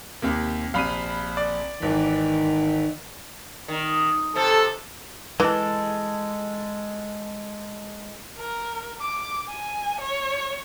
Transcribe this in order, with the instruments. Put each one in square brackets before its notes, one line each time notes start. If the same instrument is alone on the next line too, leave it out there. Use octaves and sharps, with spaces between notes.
[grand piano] D#2 C3 [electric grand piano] A#3
[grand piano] A#1 C3 D#7 [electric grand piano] F5 B5
[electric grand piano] D5
[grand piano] G#1 E3 [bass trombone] D#3
[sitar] D#3
[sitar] C3 [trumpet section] A4
[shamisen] E3 [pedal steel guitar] G#3 A4
[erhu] A#4
D6
G#5
C#5